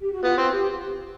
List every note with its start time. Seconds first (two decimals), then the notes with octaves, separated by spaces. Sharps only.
0.01 G4
0.12 F#4
0.23 B3 F4
0.38 C4 F4
0.52 G4